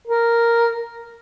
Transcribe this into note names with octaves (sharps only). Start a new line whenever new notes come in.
A#4